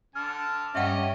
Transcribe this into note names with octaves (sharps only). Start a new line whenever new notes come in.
D3 A5 F6
G2 C#4 G4 C#5 D#5 E5 F#5 G5